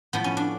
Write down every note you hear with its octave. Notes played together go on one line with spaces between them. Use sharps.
A2 F3 B3
C#4
D4